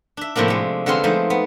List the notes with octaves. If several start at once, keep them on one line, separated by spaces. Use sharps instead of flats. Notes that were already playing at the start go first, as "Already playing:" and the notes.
D4 E5
A2 C3 F3 A#3 D4
G#3 A3
D3 G#3 B3 C4 F5 C6
F3 G#3 A3 D#4
B3